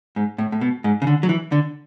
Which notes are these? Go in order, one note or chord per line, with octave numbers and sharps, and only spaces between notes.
G#2
A2
A2
B2
G#2
C#3
D3
F#3
E3
D3